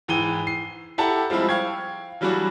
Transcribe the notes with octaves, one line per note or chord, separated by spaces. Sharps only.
G#2 E3 G5 D#7 G7
C7
E4 G4 A4 F#5 A5 A#5
F3 G3 G#3 C4 E4
F5 G5 C#6 G#6
E3 F#3 G3 D4 F#4